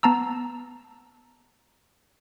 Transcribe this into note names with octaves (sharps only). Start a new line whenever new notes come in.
B3 A5 A#5 E6